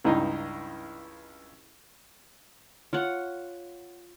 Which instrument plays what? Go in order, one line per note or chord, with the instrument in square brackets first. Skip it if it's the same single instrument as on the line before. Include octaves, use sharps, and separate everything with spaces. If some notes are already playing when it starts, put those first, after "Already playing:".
[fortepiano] C#2 G2 D#4 [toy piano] C#4 E4 D5
[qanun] F4 C#5 F#5